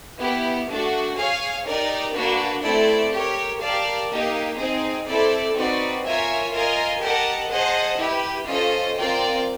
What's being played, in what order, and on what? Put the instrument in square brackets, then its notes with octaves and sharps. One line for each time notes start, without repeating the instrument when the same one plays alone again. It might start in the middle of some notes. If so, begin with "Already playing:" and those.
[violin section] B3 E4 G4
A3 D4 F#4
G#4 C#5 F5 G#5
D#4 G4 A#4 D5
A#3 D4 F#4 B4
A3 C4 E4 A4 D5
G4 A#4 C#5
G4 A#4 D5 F5 A5
A#3 D#4 G4
C4 D#4 G#4
C4 E4 A4 D5
C4 D#4 F#4 B4 D5
F4 A#4 C#5 E5 G#5
F4 A#4 D#5 G#5
G4 A#4 D#5 F#5 A5
G#4 C5 D#5 F#5 A5
E4 G4 B4
C#4 F4 A4 C5 D#5
C4 F4 A#4 D5 G5